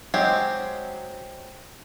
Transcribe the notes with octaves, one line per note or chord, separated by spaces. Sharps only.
F#3 G#3 C4 G4